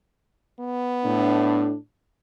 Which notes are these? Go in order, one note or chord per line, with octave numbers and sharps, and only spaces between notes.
B3
A2 D4